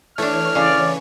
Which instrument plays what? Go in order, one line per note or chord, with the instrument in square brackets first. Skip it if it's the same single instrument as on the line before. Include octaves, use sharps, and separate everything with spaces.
[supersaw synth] E3 C#5 [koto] A3 D4 [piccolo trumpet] F6
[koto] C#3 [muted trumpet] D5